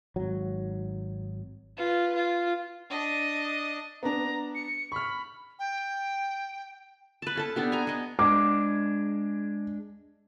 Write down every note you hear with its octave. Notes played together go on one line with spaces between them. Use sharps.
G#1 F#3
F4 B4
F4
D4 D#5
B3 D4 A#5
C#7
B5 C#6 F6
G5
B4 A5
C#4 A4 A5
B3 D4 G4
G#5 A#5
B3 D#5
G#3 D4 D6